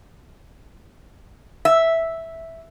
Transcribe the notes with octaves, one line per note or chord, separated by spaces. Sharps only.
E5